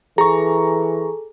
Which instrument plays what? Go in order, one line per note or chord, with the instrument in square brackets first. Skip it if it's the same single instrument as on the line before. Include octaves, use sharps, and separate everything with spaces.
[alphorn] E3 [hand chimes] G#4 [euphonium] A4 [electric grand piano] A#5 C#6